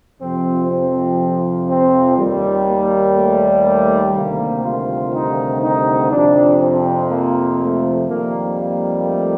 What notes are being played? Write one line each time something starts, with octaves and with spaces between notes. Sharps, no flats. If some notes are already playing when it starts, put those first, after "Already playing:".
F2 C3 F3 C4
C4
C4
D#2 D#3 G3
A#3
A3
A3
D2 C3 D#3 G3 A#3
F4
D#4
D#4
F2 C3 F3 D4
C4
A#3
A3
F2 D#3 G3 A#3
A#3
A3